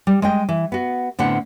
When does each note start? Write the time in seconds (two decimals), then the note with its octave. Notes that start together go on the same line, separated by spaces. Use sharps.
0.07 G3
0.22 G#3 D#5 G5
0.49 E3
0.72 B3 F#4
1.19 A2 D3 B3 C4 F#5